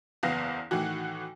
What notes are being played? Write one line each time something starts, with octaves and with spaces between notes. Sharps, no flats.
F#1 E2 B3 F5 A#6
A2 D#3 E3 F#4